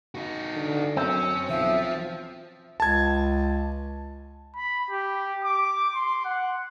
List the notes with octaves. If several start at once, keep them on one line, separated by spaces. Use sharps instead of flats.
D#4 F#4
D3
F#2 C4 C#4
B1 F3 E5
C#2 A5 G#6
B5
G4
D6
C6
F#5